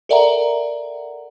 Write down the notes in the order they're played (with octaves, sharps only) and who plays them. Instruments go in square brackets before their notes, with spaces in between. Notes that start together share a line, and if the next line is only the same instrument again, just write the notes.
[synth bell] A4 A#4 D5 E5 F#5 A#5